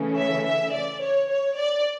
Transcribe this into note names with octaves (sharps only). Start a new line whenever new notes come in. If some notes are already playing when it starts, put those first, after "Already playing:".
Already playing: C#3 E3 A3 C#4
E5
E5
D5
C#5
C#5
D5